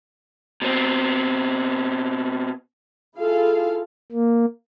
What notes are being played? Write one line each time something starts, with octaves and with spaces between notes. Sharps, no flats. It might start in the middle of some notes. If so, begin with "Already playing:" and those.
B2 C4
E4 F4 G#4 A4 F5
A#3